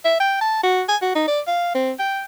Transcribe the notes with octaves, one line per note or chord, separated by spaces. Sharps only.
E5
G5
A5
F#4
G#5
F#4
D#4
D5
F5
C4
G5